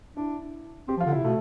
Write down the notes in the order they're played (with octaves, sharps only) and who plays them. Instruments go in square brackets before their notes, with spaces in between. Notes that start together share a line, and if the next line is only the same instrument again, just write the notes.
[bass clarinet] D4 [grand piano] E4
[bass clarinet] C4 [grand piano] G4
[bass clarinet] F3
[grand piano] F4
[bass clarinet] D3
[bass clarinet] C3 [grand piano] E4
[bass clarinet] B2 [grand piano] A3